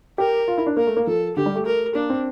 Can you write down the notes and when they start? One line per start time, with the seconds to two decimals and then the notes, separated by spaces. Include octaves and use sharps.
0.18 G4 A#4
0.48 F4
0.58 E4
0.67 D4
0.77 A#3 A#4
0.87 A3
0.97 A#3
1.07 F3 A4
1.36 D3 G4
1.46 G3
1.55 A3
1.66 A#4
1.95 A#3 D4
2.10 C4